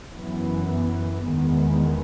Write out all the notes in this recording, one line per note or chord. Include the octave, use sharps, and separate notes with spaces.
F#2 E3 B3
E2 D#3 G#3 B3